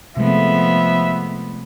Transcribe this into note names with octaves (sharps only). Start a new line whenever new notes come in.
C3 F3 G#3 A3 B3 E5